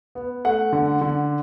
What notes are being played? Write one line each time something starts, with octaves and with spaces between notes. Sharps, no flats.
B3
A3 F#5
D3
D3